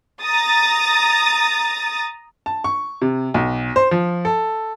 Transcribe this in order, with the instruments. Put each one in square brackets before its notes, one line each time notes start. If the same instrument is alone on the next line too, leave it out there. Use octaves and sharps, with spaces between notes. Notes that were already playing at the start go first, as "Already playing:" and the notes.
[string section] A#5 D#6 A6
[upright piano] A5
C#6
C3
B1
C5
F3
A4